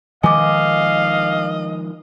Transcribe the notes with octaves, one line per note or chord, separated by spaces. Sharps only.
D#3 F3 G#3 D#5 F5 G#5 D6